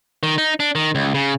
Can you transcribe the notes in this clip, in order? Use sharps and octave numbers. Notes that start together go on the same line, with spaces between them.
D#3
D#4
D4
D#3
C#2
C#3